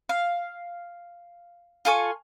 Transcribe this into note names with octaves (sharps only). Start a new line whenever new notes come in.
F5
F4 A4 G#5 C#6